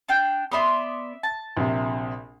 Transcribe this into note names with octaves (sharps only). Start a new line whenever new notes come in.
D4 F5 G5
B3 D5 E5 B5 C6 D#6
A5
A#1 C3